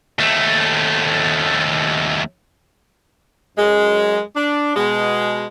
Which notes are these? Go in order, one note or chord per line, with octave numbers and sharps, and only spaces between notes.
D#2 A3
F#2 G#3
D4
B2 G#3